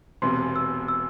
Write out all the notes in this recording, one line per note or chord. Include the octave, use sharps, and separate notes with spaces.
E1 E2 C3 C6
E6
E6